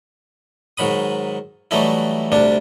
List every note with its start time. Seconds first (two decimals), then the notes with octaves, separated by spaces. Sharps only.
0.77 G#2 D#3 F#3 B5 D#6
1.71 E3 F#3 G3 A3 D#4 E4
2.32 D2 C3 G3 D4